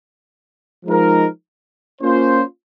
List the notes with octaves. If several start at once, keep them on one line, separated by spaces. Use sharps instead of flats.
F3 G#3 D#4 A#4
A#3 C#4 F4 C5